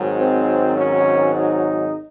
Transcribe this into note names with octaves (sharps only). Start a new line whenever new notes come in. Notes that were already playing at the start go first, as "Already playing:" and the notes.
Already playing: G#1 G#2 D#3 F#3
C4
C#4
D#4